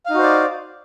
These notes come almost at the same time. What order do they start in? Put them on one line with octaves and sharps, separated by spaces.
F5 D#4 F#4 C5 D5